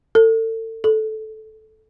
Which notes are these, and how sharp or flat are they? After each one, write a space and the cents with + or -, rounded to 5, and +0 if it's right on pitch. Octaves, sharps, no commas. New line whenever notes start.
A4 +35
A4 -15